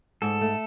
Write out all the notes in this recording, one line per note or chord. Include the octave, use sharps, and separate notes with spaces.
G#2 A4
A3